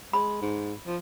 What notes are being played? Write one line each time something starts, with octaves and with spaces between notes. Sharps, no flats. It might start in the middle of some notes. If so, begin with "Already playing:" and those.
G#3 B5
G#2
F3